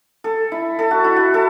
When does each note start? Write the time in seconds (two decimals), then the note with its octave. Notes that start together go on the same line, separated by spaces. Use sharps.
0.24 A4
0.52 E4
0.79 A4
0.91 F#4
1.04 E4
1.16 F#4
1.34 A4